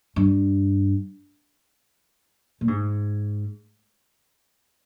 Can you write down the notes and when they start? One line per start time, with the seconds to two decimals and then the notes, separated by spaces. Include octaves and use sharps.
0.16 G2
2.61 A#2
2.68 G#2